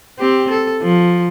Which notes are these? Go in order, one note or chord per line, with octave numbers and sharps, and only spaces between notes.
C4 G4
A4
F3